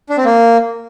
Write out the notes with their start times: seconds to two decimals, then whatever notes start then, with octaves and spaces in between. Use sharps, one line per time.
0.10 D4
0.17 C4
0.25 A#3